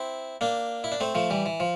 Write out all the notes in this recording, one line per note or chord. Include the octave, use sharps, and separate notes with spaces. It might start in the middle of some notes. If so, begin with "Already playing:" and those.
Already playing: C4 E4
A#3 D4
E4
D4
A3 C4
F3 A3
E3 G3
E3
F3